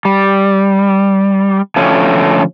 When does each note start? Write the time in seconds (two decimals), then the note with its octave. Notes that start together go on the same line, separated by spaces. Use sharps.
0.05 G3
1.76 D3 F3 A3 C#4